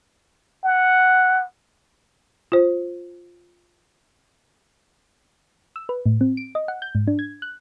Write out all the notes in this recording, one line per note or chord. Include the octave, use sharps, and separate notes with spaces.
F#5
F4 C5
E6
B4
A2
C4
D7
D#5
F#5
G6
G#2
D4
G#6
F#6